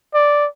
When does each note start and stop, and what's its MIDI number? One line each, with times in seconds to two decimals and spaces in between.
0.14 0.47 74